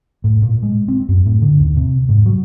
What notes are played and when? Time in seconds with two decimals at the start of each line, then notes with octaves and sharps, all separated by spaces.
0.24 A2
0.42 A#2
0.63 G#3
0.88 C4
1.09 F#2
1.26 A2
1.42 D3
1.60 D#2
1.76 C3
2.09 G#2
2.26 F#3